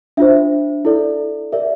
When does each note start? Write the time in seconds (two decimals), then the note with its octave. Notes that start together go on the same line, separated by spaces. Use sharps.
0.17 D4 F4 C5 E5
0.85 E4 A4 D5
1.52 G4 A#4 D5 E5